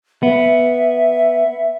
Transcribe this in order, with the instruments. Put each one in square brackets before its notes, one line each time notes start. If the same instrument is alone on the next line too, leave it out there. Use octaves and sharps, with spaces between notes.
[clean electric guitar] B3 [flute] E5